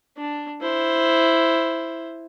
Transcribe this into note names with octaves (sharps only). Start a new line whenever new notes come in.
D4
E4 C5